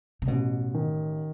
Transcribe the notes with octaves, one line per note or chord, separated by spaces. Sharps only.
C3
A1 B2
D#3